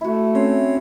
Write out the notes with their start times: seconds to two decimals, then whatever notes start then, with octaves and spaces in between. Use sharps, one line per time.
0.01 A3 E4 F#4
0.35 C4 C#4 C5 C#5